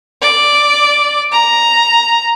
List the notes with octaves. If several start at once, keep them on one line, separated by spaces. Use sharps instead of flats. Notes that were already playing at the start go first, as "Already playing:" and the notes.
D5
A#5